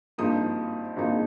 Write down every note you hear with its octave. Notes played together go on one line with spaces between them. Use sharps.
G#1 G2 F3 A#3 D#4 D#6
G#1 G2 F3 A#3 D#4